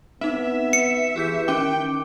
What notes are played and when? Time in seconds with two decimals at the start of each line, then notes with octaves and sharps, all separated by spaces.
0.21 B3 C4 D#4 E5
0.73 C#7
1.16 E3 G4 G#4 G6
1.48 D#3 C#4 G5 D6